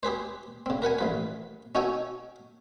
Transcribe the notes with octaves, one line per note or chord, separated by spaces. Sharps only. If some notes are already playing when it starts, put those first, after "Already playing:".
G4 G#4 B4 C5
C#3 C4
A#4 B4 F#5 G#5
A1 F3 B4
C#4 D#4 F#4 A4 G5 G#5